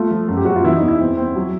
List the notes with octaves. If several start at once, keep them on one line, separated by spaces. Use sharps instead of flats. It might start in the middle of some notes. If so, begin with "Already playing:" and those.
Already playing: A3 F4
F3
F#2
G4
F#2 F#4
F4
E3 E4
D#4
E2
E4
C4
C4
F#3